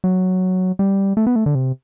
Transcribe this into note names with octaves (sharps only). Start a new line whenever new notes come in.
F#3
G3
A3
B3
A3
D3
C3